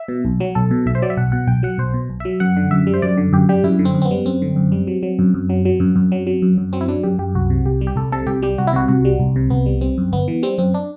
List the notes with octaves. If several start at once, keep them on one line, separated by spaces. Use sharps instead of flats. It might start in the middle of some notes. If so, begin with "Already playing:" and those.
Already playing: E5
B2
B1
F#3
B1 A4
B2
B1 E5
C5
F#3 D5
E5
B1 F#5
B2 F#5
B1 G5
F#3 F#5
B1 C5
B2
B1
F#3 E5
F#2 F#5
D3
F#2 E5
G3
C5
F#2 D5
D3
F#2 G4
G3 G4
F#2 E4
D3
C4
F#2
C4
B3
G3
F#2 C4
D3
F#2
G3
F#3
F#3
F#2
F#2
F#3
F#3
F#2
F#2
F#3
F#3
F#2
F#2
F#3 C4
E4
F#3 D4
F#2 G4
F#2 G4
C2 F#4
C3
C2 G4
G3
G4
C2 A4
C3 A4
C2 G4
G3 G4
C2 F#4
E4
C3 F#4
C2 F#4
G3
C2
C3
C2 B3
G3
G3 C4
F#2
G1 B3
E3
G3 C4
F#2 C4
D4